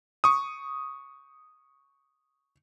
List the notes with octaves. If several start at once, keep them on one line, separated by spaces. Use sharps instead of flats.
C#6 D#6